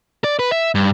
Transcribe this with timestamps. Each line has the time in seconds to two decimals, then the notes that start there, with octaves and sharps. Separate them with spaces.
0.24 D5
0.39 B4
0.52 E5
0.75 G2